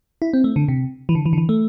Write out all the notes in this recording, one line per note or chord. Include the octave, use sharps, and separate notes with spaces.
E4
C4
A3
D3
C3
E3
D3
E3
D3
E3
A3